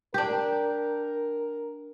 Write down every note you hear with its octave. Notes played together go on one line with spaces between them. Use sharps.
D4 G4 A#4